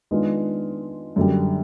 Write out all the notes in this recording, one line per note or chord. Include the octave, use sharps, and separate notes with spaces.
D#3 G#3 B3 D4 F4
F#2 D3 G3